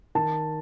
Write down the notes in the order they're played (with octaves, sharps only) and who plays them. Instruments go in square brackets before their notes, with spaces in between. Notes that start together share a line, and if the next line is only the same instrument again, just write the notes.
[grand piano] D#3 A5